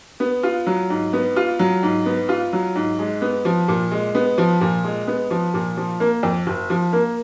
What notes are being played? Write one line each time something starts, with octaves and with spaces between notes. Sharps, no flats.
B3
F4
F#3
G#2
B3
F4
F#3
G#2
B3
F4
F#3
G#2
G#3
B3
F3
A#2
G#3
B3
F3
A#2
G#3
B3
F3
A#2
F3
A#3
F2
F#1
F3
A#3